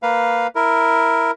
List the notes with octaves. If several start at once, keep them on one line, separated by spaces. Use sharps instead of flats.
A#3 B4 F5
E4 A#4